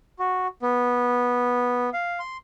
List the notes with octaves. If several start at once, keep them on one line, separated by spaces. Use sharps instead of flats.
F#4
B3
F5
C6